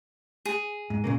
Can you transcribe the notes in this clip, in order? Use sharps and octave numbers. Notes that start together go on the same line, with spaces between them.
G#4
G#2
A#2 C#3 A#3